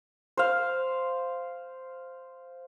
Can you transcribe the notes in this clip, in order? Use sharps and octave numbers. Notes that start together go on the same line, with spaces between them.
C5 F5